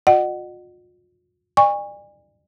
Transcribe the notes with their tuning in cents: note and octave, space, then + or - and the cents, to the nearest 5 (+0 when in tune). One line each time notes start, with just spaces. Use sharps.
F4 +45 D#5 -40 F#5 +20
D5 +35 G#5 -35 C#6 +0